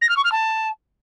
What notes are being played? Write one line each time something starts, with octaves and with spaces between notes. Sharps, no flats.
A#6
F6
C#6
F6
A5